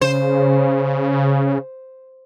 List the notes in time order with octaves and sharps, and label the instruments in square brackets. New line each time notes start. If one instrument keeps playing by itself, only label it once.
[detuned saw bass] C#3 [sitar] C5